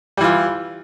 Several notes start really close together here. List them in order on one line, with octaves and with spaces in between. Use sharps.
G3 E3 F4